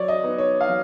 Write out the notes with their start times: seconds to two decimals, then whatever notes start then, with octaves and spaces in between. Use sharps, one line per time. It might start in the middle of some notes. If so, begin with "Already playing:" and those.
Already playing: F#3 C#5 D5
0.08 D#5
0.23 B3 D#4
0.38 C#5
0.60 F5
0.68 F#3